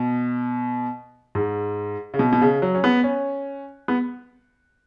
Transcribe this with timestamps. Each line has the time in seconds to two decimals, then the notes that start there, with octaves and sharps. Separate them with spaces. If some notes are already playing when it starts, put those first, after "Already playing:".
Already playing: B2
1.35 G#2
2.14 C#3
2.19 B2
2.33 B2
2.41 C#3
2.62 F#3
2.75 C#4
2.84 B3
3.04 C#4
3.88 B3